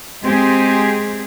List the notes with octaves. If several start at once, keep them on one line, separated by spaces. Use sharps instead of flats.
G#3 C4 G4 G#4